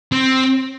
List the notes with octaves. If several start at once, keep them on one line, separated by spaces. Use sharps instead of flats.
C4